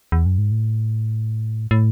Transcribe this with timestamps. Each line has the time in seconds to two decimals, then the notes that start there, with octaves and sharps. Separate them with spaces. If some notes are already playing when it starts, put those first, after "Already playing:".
0.12 E2
0.26 F#2
0.38 G#2
0.52 A2
1.71 A2